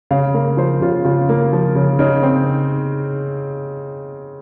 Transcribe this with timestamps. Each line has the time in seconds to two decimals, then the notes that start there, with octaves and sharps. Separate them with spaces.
0.11 C#3 F5
0.34 A#3
0.57 F3 C5
0.81 C#3 F4
1.05 C#3 F4
1.29 A#3
1.53 F3
1.75 C#3
1.99 C#3 D#4
2.23 C4